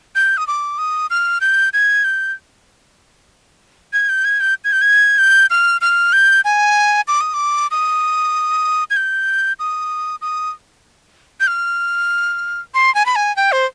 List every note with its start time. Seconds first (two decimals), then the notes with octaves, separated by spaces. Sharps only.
0.15 G6
0.37 D#6
0.47 D6
0.78 D#6
1.10 F6
1.41 G6
1.73 G#6
2.04 G6
3.93 G#6
4.09 G6
4.25 G#6
4.40 G6
4.64 G#6
4.72 G6
4.81 G#6
5.18 G6
5.50 F6
5.81 F6
6.13 G6
6.45 G#5
7.08 D6
7.21 D#6
7.34 D6
7.71 D#6
8.90 G#6
8.96 G6
9.59 D#6
10.21 D#6
11.40 G6
11.47 F6
12.74 C6
12.95 G#5
13.06 B5
13.16 G#5
13.36 G5
13.52 C5